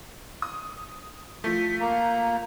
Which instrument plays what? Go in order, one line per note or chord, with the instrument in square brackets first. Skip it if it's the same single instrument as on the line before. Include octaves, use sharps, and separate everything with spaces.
[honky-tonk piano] D#6
[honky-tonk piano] F3 A3 [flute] B6
[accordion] A#3 [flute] A#5